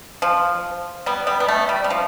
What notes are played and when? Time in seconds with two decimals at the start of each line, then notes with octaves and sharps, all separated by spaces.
0.22 F3
1.06 G3 B3
1.27 G3 B3
1.40 B3
1.49 A3
1.69 G3
1.84 G3
1.90 F3